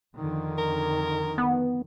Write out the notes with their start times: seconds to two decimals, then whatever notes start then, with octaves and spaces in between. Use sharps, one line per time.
0.15 F2 D3 D#3
0.59 A#4
1.38 B3